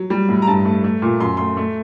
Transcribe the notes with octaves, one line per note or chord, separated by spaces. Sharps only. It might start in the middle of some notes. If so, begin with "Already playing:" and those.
Already playing: F#3
G3
A2
A#5
G2 A5
A3
A3
A#2
F#2 C6
A3 C6
A3